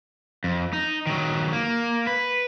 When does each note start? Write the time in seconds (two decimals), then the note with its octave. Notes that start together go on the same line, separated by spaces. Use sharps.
0.44 F2
0.73 D#4
1.07 D#3 F#3
1.53 A#3
2.07 B4